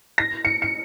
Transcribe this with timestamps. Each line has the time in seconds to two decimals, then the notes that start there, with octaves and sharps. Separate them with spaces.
0.18 A#6
0.45 C#7
0.62 C#7